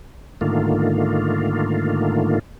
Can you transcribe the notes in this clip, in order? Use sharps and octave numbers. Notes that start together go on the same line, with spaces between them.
G#2 D3 D#3 A3 A#3 F4